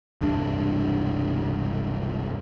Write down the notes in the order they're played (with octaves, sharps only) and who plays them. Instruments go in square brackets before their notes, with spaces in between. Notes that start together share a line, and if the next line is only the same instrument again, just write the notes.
[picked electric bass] E1 C2 G2 D4